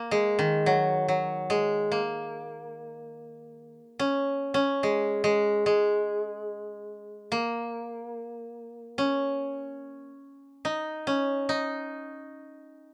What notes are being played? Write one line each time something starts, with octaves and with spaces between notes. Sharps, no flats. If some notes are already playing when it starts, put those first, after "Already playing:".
Already playing: A#3
G#3
D#3
F#3
F#3
G#3
A#3
C#4
C#4
G#3
G#3
G#3
A#3
C#4
D#4
C#4
D#4